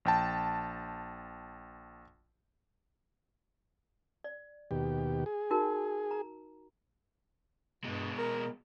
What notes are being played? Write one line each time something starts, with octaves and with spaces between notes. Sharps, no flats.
A#1 G5 A5
D5
D#2 B2 G4
G#4
D#4 F#4 A#4
A#5
G2 B2 G#3
A#4